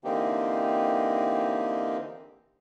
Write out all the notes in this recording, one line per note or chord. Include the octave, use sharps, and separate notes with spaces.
D3 E3 A#3 C4 D#4 G4